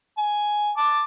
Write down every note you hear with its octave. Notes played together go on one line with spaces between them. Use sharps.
G#5
A5 D6